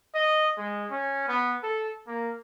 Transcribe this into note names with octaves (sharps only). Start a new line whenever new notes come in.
D#5
G#3
C#4
B3
A4
A#3